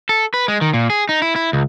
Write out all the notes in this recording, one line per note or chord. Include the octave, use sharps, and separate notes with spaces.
A4
B4
G#3
D#3
A#2
G#4
D#4
E4
E4
C#2